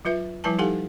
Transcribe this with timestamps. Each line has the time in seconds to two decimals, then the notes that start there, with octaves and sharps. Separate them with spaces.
0.05 F#3 F4 B4 E5
0.44 F3 G3 E4 B4 G#5 A5
0.59 D#4 G4 A4 F5 F#5 G#5